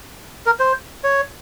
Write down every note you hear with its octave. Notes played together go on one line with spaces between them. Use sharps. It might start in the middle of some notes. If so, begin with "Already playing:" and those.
A#4
C5
C#5